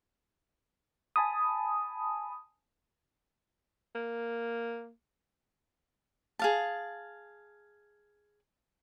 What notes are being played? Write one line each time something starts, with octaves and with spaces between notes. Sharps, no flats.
G#5 A5 B5 D#6
A#3
G#4 F5 A5